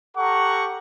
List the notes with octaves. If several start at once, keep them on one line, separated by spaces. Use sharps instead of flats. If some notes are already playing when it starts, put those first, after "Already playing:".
G4 A4 F#5 A#5 C#6